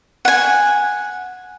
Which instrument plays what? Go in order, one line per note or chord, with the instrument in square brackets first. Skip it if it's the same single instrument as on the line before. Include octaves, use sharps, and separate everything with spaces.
[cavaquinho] F#5 G#5